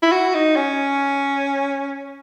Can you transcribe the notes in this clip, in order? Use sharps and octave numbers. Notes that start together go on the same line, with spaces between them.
E4
F#4
D#4
C#4